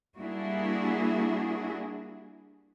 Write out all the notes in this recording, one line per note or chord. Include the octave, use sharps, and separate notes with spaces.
G3 A#3 D4 E4 F#4 G#4